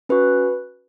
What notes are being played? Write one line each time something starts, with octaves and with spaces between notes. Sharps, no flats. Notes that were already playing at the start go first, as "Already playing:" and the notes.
C#4 F#4 B4